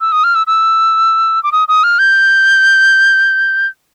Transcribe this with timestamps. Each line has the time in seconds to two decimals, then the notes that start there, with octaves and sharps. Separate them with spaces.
0.01 E6
0.12 D#6
0.24 F6
0.35 E6
0.47 E6
1.43 D6
1.52 D#6
1.68 D#6
1.84 F6
1.99 G6